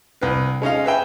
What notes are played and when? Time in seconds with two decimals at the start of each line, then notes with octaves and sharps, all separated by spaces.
0.21 C2 B4
0.62 G#3 C#4 D#4 F5
0.85 G#4 B4 E5 G5